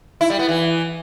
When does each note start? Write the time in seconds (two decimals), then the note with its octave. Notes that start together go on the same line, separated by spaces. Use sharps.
0.21 E4
0.30 G3
0.39 B3
0.48 E3